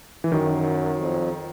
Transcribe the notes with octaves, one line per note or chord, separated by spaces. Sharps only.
E3
F#2 D#3
F2